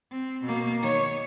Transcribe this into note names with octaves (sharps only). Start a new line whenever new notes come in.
C4
B2 A#3
D#3 C#5